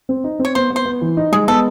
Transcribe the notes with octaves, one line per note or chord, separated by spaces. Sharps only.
C4
D#4
C4
C#5
B3 C5
B3
C5
B3
E3
D#4
G#3 G#4
B3 A4